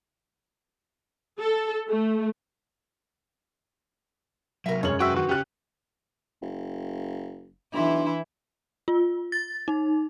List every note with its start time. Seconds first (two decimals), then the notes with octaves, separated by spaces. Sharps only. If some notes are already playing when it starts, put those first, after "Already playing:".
1.38 A4
1.89 A3
4.66 C3 F#3 A#4 E5
4.83 F#2 G#3 C#4 C#5 F#7
5.00 C3 C4 F#4 B4 E5 G5
5.17 D3 D#3 F#4
5.29 C#3 C#4 G4 F#6
6.42 F#1
7.74 B1 E3 D4 E4 C6
8.88 F4
9.32 A6
9.68 D#4